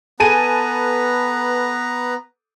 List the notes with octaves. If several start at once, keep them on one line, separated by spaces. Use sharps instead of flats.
B3 A4 B4 G#5 A#5 D#7